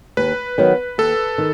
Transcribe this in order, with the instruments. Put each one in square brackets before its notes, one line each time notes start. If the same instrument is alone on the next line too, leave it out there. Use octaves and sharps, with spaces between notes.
[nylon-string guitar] D#2 [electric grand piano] B4
[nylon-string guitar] D#3 F#3 B3
[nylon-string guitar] D#2 [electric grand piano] A4
[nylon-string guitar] D#3